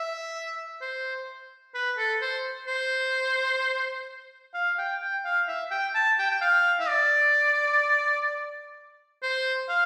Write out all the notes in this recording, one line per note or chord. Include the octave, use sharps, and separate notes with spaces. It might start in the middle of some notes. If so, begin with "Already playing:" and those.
Already playing: E5
C5
B4
A4
C5
C5
F5
G5
G5
F5
E5
G5
A5
G5
G5
F5
E5
D5
C5
F5